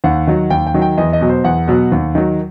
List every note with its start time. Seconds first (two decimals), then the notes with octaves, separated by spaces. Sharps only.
0.04 D#2 F#5
0.27 D#3 F#3
0.50 D#2 G5
0.67 G5
0.74 D#3 F#3
0.82 G5
0.98 E2 D#5
1.13 D#5
1.21 B2 F#3
1.29 C5
1.44 E2 F#5
1.68 B2 F#3
1.92 D#2
2.15 D#3 F#3